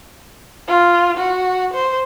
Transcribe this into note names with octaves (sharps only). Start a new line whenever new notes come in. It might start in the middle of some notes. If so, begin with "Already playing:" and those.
F4
F#4
C5